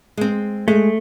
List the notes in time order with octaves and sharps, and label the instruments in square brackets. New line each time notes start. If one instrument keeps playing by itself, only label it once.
[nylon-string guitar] G#3 C4
[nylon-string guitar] G#3 [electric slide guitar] A3